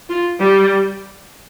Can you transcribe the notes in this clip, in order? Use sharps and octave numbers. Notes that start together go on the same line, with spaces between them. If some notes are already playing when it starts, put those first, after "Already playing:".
F4
G3